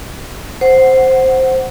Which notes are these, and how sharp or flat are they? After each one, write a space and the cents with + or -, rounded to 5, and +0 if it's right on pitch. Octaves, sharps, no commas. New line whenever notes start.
C5 +0 F#5 +0